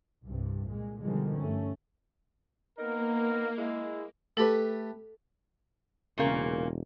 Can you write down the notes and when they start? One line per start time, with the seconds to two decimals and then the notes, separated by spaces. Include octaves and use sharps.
0.24 C2 G2 C3
0.67 A#2 G#3
1.02 B2 D3 D#3 F3 G3 G#3
1.37 G2 A3 C#4
2.78 A#3 B3 D#4 A#4
3.57 G#3 E4
4.37 A3 G4 A4 B4
6.18 E1 A#2 C#3 A#3